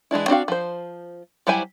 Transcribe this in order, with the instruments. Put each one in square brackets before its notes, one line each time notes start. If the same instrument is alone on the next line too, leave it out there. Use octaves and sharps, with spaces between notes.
[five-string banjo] E3 G#3 D4 E4
C4 D4 F#4 F5
F3 C5
F#3 G3 E4 C5 G#5